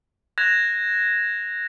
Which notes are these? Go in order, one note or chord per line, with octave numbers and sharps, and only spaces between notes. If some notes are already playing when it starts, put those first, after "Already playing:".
F#6 G#6 A#6 E7 F7